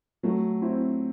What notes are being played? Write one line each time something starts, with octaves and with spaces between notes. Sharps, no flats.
F#3 A3
C4 E4